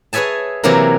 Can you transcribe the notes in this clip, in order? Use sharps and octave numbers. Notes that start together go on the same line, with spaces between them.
G#4 B4 C#5 E5 G#5 A5
C3 E3 F#3 A#3 E4 A#4